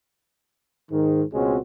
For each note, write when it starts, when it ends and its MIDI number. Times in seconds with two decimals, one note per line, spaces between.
0.91 1.22 44
0.91 1.22 51
1.34 1.58 37
1.34 1.58 47
1.34 1.58 56
1.34 1.58 60
1.34 1.58 61
1.34 1.58 66